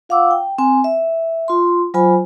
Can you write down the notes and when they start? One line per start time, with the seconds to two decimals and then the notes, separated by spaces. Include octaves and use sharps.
0.09 F4 F5 F#5 D6 E6
0.31 G5
0.58 C4 G#5
0.84 E5
1.48 F4 C6
1.94 F#3 F4 C5 G#5 B5